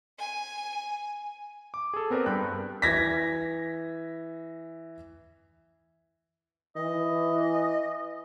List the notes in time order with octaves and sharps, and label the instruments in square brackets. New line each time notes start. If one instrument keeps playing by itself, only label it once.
[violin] G#5
[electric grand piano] D6
G#4 A4
B3 C4 A#4 B4 D5
G2 A#4 G5 F#6
[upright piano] E3 G#6 A#6 B6
[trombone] E3 [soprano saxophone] D#5